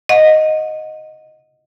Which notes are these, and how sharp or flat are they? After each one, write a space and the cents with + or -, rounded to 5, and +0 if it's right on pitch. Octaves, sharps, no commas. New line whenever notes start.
D#5 +0 F#5 -25